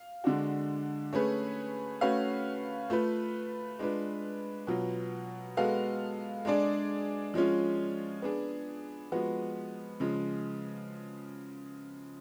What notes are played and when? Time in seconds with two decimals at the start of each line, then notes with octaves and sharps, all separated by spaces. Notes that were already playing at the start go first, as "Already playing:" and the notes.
Already playing: F5
0.24 D3 G#3 D4 F#4
1.13 A3 C#4 G#4 B4
2.01 A3 C#4 F#4 B4 F5
2.90 A3 F4 B4
3.79 G#3 D4 F4 B4
4.67 B2 F#3 B3 F4
5.57 G#3 B3 F#4 A4 F5
6.45 G#3 D4 G#4 D5
7.34 F3 G#3 C#4 F4
8.22 B3 D4 G#4
9.12 F3 G#3 B3 F#4
10.00 C#3 F3 G#3